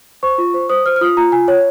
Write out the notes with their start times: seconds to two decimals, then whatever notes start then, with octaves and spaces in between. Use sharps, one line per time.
0.23 C5 C#6
0.38 F4
0.54 C5
0.69 C5 D#6
0.86 C5 F6
0.96 F6
1.01 F4 D#6
1.17 F4 A#5
1.32 F4 G#5
1.48 C#5